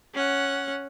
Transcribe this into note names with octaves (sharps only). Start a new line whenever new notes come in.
C#4 F#5